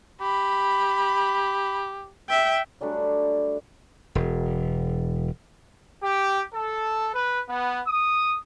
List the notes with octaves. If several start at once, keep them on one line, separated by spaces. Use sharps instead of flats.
G4 B5
E5 G5
F#3 G3 A3 D4
E1
G4
A4
B4
B3
D#6